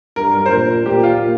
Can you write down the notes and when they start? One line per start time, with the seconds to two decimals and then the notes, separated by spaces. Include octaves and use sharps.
0.16 G2 A#4
0.35 A#4
0.46 C5
0.51 A#2 A#4
0.86 A#2 G4
1.03 F4